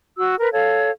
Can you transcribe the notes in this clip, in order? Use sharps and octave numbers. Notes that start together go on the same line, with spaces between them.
F#4 E6
A#4 B4
A4 C#5 F5